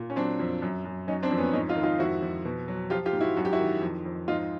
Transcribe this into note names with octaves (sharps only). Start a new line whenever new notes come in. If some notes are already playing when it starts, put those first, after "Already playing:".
Already playing: A#2
C#4
F#3 C4 D4
F2
F#2
F#2
F#3 C#4 D#4
C4 D4
F2
B3 C#4
G#2 C#4 D#4
D#4 F4
D#3
D#4 F4
F2 E4 F#4
F2
B2
F#3
F3 F4 G4
F4 G4
G#2
E4 F#4
F#2 F#4
G4
E4 F#4
D#3
F2
F2
G#2 D#4 F4